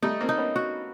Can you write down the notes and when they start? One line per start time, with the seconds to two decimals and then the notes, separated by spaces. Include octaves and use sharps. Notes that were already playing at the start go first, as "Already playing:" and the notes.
0.03 G3 A3 D#4
0.21 A#3 C4
0.29 D#4
0.38 B3 C#4
0.56 F#4